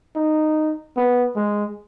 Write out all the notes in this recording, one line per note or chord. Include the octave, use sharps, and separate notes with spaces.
D#4
B3
G#3